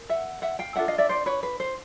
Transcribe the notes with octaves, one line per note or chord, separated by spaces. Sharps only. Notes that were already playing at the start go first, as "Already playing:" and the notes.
Already playing: A#4
E5 F#5
E5 F#5
F5 G5
D4 F4 A4 E5 F#5
D#5 F5
D5 E5
C5 D5
B4 C#5
B4
C5